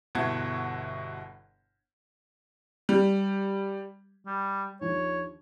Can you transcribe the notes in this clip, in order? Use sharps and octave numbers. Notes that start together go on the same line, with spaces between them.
G1 B2 E4 F#5 A5 G#6
G3
G3
D#2 F3 D4 C#5